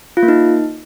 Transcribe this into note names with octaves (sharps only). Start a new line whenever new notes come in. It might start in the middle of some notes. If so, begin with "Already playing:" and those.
F4
A#3
D#4